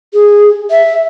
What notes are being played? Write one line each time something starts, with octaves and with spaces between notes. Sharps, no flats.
G#4
E5